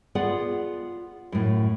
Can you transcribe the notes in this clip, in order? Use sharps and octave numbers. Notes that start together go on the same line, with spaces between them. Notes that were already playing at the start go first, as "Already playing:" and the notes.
B3 F4 G#4 D5 F#5
F#2 A2